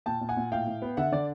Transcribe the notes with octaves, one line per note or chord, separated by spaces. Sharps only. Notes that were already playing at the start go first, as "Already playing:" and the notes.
A#2 G5 A5
A#2
F#5 G#5
A#2
A2 F5 G5
A2
B3
D3 E5 F#5
D3 D5